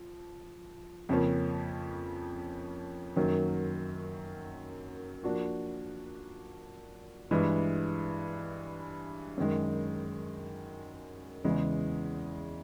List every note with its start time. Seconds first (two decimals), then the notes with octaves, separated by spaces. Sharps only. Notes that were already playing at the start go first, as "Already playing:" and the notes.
Already playing: F3
1.09 F2 C#3 F3 A#3 C#4
3.16 F#2 D#3 F#3 A#3
5.24 F3 A#3 D4 F#4
7.31 G2 E3 G#3
9.37 F#2 D#3 G#3
11.44 E2 C#3 E3 G#3